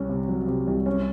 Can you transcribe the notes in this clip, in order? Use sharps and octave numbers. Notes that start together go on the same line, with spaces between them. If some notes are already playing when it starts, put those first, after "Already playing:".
Already playing: C2 C#4
C3
F#3
C3
C2
C#4